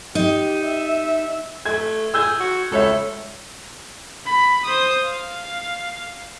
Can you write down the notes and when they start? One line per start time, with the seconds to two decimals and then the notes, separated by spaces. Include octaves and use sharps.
0.15 D#4 G4
0.64 E5
1.66 A3 G#6
2.14 G#4 E6 G6 G#6
2.40 F#4
2.71 C#2 A4 C#5 E5
4.26 B5
4.65 C5 D#6
5.04 F5